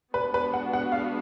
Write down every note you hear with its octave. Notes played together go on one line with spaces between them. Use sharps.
G#3 B3 D4 F#4 B4
B4
F#5
F#5
F5